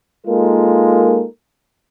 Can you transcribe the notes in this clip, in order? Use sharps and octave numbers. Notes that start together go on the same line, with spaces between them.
G#3 A#3 D#4 F4 A4 A#4